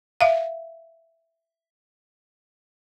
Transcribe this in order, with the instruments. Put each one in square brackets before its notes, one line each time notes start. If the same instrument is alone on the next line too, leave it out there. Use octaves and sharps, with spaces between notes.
[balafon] E5 F5